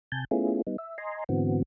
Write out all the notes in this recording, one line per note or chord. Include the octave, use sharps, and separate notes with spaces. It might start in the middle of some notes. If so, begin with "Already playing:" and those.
C3 G#5 A5 G6
A3 B3 C#4 E4 F4 G#4
G3 B3 D#4
E5
D#5 G#5 A#5 C6
G#2 D3 E3 B3 C4 F#4